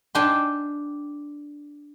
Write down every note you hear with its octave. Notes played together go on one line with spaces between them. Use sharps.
D4 G5 G#5 C6